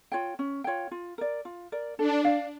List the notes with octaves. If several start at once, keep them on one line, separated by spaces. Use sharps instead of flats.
F4 C#5 G5
C#4
F4 C#5 G5
F4
A#4 D5
F4
A#4 D5
D4 A4
D5 F5